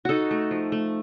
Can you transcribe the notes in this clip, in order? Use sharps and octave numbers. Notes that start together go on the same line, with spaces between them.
D#4 F#4 A4
A3
F3
A3